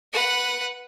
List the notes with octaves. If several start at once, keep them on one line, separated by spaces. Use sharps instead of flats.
B4 F#5